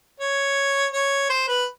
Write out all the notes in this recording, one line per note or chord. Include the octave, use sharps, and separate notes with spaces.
C#5
C#5
C5
B4